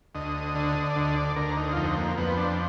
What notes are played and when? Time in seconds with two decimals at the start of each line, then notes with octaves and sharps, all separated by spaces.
0.15 D2 D#5
0.55 D3
0.90 D5
0.96 D2 D#5
1.16 D5
1.36 D2 A#4
1.57 D#4
1.73 F4
1.76 F2 D#4
1.97 A#3
2.17 F2 B3
2.37 D4